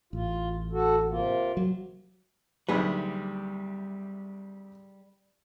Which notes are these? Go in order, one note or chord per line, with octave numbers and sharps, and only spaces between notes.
A1 F4
F#4 A4
C3 A#3 F4
F#3
D2 C3 F#3 G3 A#3 D#4 G#4 B4